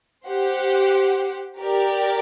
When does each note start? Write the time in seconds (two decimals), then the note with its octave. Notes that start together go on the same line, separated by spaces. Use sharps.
0.28 G4 C5 F#5
1.59 G4 A#4 D5 G5